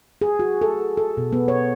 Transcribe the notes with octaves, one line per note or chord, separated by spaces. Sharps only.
G#4
F#4
A4
A4
B2
B3
C#5